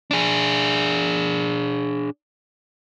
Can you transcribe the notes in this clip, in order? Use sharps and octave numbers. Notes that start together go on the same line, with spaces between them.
D4 G#4